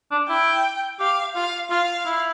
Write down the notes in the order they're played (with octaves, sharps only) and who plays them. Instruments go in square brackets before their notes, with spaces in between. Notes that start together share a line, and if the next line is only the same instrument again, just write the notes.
[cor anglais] D4
[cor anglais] E4 [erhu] G5
[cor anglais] G4 [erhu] F5
[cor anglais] F4 [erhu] F5
[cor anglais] F4 [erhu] F5
[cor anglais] E4